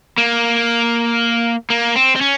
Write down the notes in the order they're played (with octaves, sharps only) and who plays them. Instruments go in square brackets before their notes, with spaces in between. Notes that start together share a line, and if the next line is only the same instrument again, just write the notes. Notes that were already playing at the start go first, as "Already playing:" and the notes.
[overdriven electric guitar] A#3
A#3
C4
C4
C#4